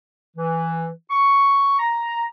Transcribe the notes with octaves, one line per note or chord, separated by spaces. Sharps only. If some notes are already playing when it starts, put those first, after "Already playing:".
E3
C#6
A#5